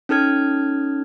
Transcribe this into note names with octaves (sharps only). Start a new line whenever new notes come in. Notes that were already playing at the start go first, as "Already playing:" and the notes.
C#4 D#4 A4 F6 G#6